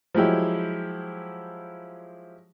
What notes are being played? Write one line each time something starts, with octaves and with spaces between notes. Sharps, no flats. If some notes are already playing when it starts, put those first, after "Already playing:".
F3 F#3 G#3 E4 G4